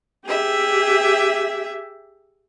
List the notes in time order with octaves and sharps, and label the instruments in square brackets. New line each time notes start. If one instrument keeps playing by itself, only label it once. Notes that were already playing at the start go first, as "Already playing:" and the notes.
[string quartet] G4 G#4 E5